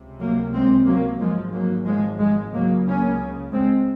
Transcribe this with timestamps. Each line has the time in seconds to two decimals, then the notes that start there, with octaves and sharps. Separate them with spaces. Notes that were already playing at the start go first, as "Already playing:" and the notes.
Already playing: C#2 C3
0.20 F#3 A#3
0.53 G#3 C4
0.87 F#3 A#3
1.20 G#1 G#2 F3 G#3
1.53 F#3 A#3
1.86 F3 G#3
2.20 F3 G#3
2.53 C#2 C#3 F#3 A#3
2.86 A#3 C#4
3.52 G#3 C4